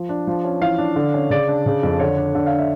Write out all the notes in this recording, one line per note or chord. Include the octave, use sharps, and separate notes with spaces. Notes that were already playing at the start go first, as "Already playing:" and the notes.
Already playing: F3
D4
F3
C#4
E3 F5
D4
D3
C#4
C#3 D5
D4
C#3
F2
D3 C#5
D4
D3
F5
D4
E5